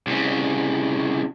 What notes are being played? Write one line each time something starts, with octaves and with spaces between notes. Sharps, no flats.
C2 C#3